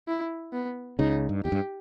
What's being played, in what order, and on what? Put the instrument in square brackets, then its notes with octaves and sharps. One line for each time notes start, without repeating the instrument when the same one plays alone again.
[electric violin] E4
B3
[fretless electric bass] C#2 C#3 [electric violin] D#4
[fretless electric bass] G2
[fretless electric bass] E2 [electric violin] G4
[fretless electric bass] G2